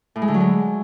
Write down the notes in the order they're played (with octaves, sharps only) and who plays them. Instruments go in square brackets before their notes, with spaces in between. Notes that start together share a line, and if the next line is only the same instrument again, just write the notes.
[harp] A2
G#3
D3
F#3
G#3